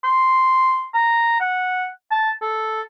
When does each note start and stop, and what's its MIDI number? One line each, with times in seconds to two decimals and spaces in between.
0.04 0.86 84
0.95 1.37 82
1.40 1.87 78
2.11 2.31 81
2.42 2.82 69